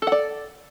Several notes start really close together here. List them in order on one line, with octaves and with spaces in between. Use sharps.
A4 F#5 D5